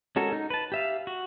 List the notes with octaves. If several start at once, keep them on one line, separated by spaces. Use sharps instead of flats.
G#3 C#4 F#4 A4 A#4
D#4
B4 A5
G4 E5 F5
F#4